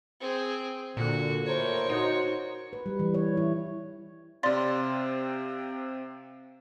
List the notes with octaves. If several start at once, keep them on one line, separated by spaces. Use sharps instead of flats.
C4 G#4
A#2 D3 F#4
D#2 A2 A#4 C5 C#5
D#4 F#4
B4
G3
E3
C#5
E4
C3 C4 D5 F5 C6 A6